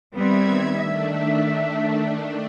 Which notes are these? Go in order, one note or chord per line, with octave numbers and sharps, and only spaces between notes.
D#3 G3 B3 C4 E5 G#6
D#3 A3 D4 E5